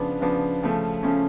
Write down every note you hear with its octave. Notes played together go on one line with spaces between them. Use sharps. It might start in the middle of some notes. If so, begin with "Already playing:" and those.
Already playing: C#3 F3 B3 D4
C#3 F3 B3 D4
C#3 F3 A3 C#4
C#3 F3 A3 C#4